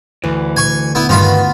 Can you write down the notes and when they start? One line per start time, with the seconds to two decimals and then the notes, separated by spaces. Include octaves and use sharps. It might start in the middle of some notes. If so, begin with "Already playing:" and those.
0.24 D2 E3
0.57 G#5 C#6
0.95 B3 E4
1.09 G2 D#3 B3 F4 B5